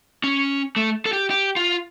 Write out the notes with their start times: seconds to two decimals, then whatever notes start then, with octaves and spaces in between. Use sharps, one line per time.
0.24 C#4
0.76 A3
1.06 A4
1.13 G4
1.30 G4
1.56 F4